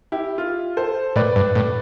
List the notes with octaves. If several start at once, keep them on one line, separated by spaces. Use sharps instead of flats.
E4 G4
F4
A4 C5
A2 B4 D5
G2
A2